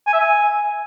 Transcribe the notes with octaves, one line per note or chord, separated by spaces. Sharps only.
G#5
E5
G#5